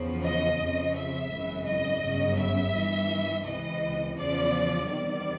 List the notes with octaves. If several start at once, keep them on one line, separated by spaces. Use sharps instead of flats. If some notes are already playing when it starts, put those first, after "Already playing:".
Already playing: E2 C#3 F3
D#5
F2 C#3 F3
E5
G#1 F#2 C#3 E3
D#5
G1 F#2 C#3 F#3
E5
G1 G2 E3 G3
C#2 C3 E3 D#5
E2 C#3 F3 D5
E2 C3 D#3 G3 D5